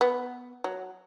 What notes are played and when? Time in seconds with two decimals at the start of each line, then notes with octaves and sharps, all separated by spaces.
0.01 B3
0.64 F#3